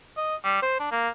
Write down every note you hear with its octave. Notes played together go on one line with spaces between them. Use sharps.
D#5
G3
C5
D4
A#3